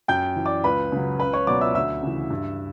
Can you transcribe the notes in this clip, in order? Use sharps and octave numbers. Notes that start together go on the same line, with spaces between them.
F#2 G5 G6
E3
D5 D6
C#2 B4 B5
C#3 F#3
C#2 B4 B5
C#5 C#6
B2 F#3 D5 D6
E5 E6
D2 E5 E6
C#3 E3
G2